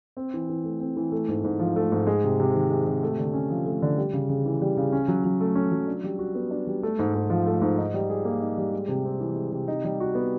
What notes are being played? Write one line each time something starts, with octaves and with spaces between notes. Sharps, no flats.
C4
E3
E3
A3
C4
E3
A3
G#2
G#2
F3
A3
G#2
G#3
C3
C3
D#3
G#3
C3
A3
D3
C#4
F3
A3
D3
G3
C#3
C#3
E3
G3
C#3
C#4
F#3
F#3
A3
C#4
F#3
D4
G3
F#4
B3
D4
G3
A3
G#2
G#2
F3
A3
G#2
D#4
G3
G#4
A#3
D#4
G3
G#3
C3
C4
E3
G#3
C3
D#4
G3
F#4
B3